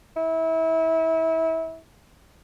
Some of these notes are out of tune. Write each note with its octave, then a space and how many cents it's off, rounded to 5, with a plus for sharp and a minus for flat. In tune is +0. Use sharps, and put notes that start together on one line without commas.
E4 -25